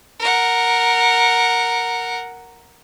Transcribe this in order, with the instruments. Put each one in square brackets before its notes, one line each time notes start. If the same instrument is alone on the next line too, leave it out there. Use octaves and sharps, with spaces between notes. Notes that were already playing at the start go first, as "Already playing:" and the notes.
[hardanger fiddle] A#4 F#5